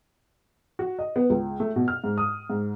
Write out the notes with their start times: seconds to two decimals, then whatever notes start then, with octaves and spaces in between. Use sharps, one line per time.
0.79 F#4
0.99 D#5
1.16 B3
1.30 C#2
1.60 A3
1.76 B2
1.88 F6
2.04 G#2
2.18 D#6
2.50 G#2